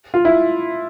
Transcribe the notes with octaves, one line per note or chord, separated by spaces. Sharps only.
F4
E4